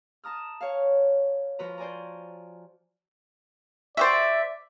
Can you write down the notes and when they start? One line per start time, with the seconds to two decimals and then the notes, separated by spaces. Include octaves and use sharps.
0.24 A5 A#5 D#6 F6
0.61 C#5 F5
1.59 F3 F#4 B4 A#5
1.78 C5 D5 G#5 A#5
3.97 F#4 G4 C5 D5 E5